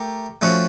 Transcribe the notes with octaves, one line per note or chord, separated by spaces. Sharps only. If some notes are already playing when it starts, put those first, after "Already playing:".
Already playing: A3 G4 A#4
F3 A3 C#4 F#4